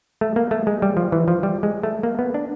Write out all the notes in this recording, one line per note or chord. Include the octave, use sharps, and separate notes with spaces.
A3
A#3
A3
G#3
G3
F3
E3
F3
G3
G#3
A3
A#3
B3
D4